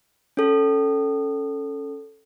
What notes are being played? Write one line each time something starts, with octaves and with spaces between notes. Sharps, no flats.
C#4 A4